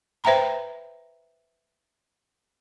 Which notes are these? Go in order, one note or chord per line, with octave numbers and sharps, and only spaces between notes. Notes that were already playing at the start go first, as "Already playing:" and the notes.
B4 C5 E5 G5 A#5 B5